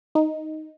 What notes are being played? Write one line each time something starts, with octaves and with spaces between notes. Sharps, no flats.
D#4